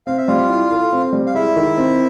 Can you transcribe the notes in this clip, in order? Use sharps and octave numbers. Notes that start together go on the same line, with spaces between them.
C4 F5
E5
G3 F4 F5
E4
A4
C4
G3
F5
G#3 E4 E5
D#3
C4